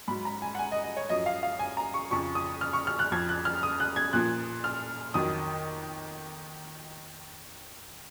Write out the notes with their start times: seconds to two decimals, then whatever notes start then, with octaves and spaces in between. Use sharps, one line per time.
0.08 G#2 F#3 B5
0.25 A#5
0.42 G#5
0.55 F#5
0.59 G#5
0.72 D#5
0.84 D#5
0.97 C#5
1.09 F#2 F3 D#5
1.26 F5
1.43 F5
1.59 G#5
1.77 A#5
1.94 C#6
2.11 F2 C#3 F3 C#6
2.35 D#6
2.61 F6
2.73 C#6
2.87 F6
2.99 F#6
3.12 F2 F3 G#6
3.29 F#6
3.45 F6
3.63 D#6
3.80 F#6
3.96 G#6
4.13 A#2 F3 F#6
4.64 F6
5.14 F2 D#3 F#3 D#6